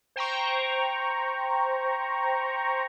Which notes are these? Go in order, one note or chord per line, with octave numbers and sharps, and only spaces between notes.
C5 G5 A#5 C#6